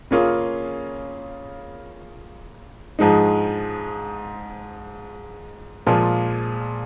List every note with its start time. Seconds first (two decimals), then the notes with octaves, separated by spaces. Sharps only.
0.11 C#3 A#3 C#4 F4 G#4
2.99 G#2 F3 G#3 D#4
5.86 A#2 F3 G#3 F4 G#4